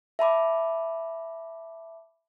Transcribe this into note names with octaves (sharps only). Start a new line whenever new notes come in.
E5 A5 B5 D6